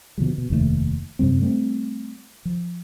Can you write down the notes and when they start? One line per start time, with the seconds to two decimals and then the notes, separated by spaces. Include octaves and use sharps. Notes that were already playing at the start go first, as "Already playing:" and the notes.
0.18 B2 D3 F3 G3
0.38 B2
0.50 F1 D#2 C3 A3
1.19 F#2 C3 G3 C4
1.41 G3 A3 B3 C4
2.45 F3